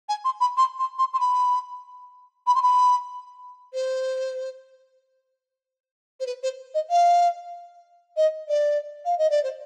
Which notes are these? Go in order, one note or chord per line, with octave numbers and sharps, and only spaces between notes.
G#5
C6
B5
C6
C6
C6
C6
B5
B5
C6
B5
C5
C5
B4
C5
D#5
F5
D#5
D5
F5
D#5
D5
C5